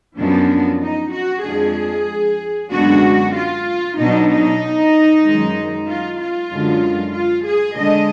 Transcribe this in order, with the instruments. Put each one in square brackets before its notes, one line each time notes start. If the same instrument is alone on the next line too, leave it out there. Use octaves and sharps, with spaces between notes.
[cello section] F#2 F3 B3 D4
D#4
F#4
F2 F3 G#3 D4 G#4
F#2 D3 G#3 B3 D4 F#4
F4
B2 F#3 D4 D#4
D#4
F#2 D#3 G#3
F4
F4
F#2 D3 G#3
F4
G#4
D3 G#3 D#5